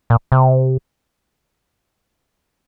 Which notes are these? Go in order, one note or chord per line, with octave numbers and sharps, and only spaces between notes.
A#2
C3